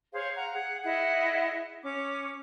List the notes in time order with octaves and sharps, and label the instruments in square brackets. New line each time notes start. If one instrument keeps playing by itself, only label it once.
[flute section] G#4 C5 C#5 F5
F5 F#5 A#5
G#4 F#5
E4 G#4 D#5 F#5
C#4 D6